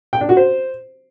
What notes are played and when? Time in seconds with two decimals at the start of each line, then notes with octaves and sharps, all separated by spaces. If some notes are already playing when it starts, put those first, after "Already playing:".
0.13 G5
0.21 D4
0.29 F#4
0.37 C5